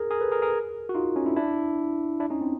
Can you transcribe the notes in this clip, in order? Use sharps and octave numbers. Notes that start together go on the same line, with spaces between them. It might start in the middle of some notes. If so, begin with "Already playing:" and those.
Already playing: G#4 A#4
G#4 A#4
A4 B4
G#4 A#4
G#4 A#4
F#4
D#4 F4
C#4 D#4
D4 E4
D4 E4
D4 E4
C#4 D#4
C4 D4